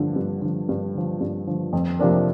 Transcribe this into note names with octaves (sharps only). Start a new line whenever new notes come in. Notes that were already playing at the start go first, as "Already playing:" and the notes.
Already playing: G2 D3 F3
G2
D3 F3
G2
D3 F3
G2
D3 F3
F2
C3 F3 D4 A#4